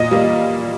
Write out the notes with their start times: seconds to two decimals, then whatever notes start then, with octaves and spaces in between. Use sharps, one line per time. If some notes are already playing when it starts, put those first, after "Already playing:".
Already playing: A#2 D#5
0.11 G3 A#3